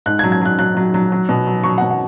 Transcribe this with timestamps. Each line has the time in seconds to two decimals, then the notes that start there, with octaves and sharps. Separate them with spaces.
0.06 G#2 F#6
0.19 G#6
0.24 F#3
0.32 G#6
0.42 F#3 F#6
0.59 F#3 F#6
0.77 F#3
0.94 F#3
1.12 F#3
1.29 B2
1.47 F#3
1.64 F#3 C#6
1.78 F#5
1.82 B2
1.91 F#5